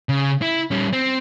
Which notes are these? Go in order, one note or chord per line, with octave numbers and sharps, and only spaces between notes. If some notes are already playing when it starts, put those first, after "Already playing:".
C#3
E4
G3 C#4
C4